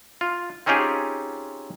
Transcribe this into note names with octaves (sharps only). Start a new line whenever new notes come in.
F4
C4 C#4 D#4 F4 G4 G#4